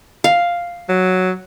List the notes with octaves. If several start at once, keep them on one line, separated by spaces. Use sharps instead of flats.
F5
F#3